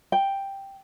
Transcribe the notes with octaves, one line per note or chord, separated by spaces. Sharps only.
G5